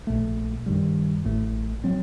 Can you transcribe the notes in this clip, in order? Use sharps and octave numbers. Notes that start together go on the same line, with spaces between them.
A#1 A#2 A3
G2 D#3 G3
A1 A2 A3
F#3 C4